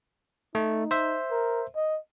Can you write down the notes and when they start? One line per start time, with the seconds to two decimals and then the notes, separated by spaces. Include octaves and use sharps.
0.55 A3 D#4
0.91 C5 E5
1.31 A#4
1.76 D#5